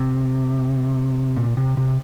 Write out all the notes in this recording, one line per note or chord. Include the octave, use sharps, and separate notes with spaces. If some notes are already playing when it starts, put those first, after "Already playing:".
Already playing: C3
A#2
C3
C3